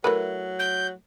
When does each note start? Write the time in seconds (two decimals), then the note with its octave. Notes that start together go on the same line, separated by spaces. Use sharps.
0.04 F#3 A3 E4 A#4 B4
0.59 G6